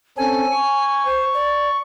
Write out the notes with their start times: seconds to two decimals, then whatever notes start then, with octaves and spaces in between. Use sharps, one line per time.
0.17 C4 C#4 A4 G#5
0.52 C#6
1.05 C5
1.34 D5